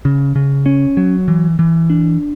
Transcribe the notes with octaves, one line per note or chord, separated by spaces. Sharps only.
C#3
C#3
C#4
F#3
E3
E3
D4